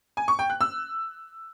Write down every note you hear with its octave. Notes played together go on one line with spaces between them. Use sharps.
G#5
C#6
G5
F#6
E6